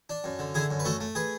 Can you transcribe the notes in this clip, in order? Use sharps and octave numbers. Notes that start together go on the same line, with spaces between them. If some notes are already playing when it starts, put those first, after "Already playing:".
D4
F#2
D3
D3 E4 G#4
F#2
B4
A3 F#4 A4
A3
G#4 B4